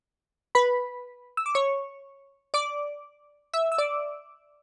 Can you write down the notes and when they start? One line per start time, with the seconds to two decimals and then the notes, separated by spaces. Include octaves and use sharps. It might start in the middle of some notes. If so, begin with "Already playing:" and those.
0.55 B4 B5
1.37 E6
1.46 D6
1.55 C#5 C#6
2.54 D5 D6
3.53 E5 E6
3.72 E6
3.78 D5 D6